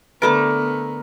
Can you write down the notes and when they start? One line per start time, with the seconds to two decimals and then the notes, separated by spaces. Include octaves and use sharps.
0.22 D3 A3 B3 A#4 B4 B5 D6